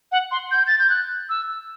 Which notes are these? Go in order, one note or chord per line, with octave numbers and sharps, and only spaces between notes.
F#5
C6
G6
A6
G6
F#6
E6